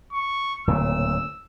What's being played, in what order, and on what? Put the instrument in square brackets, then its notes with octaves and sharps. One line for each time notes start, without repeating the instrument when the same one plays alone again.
[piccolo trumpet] C#6
[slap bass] D1 A#2 C#3 [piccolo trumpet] E6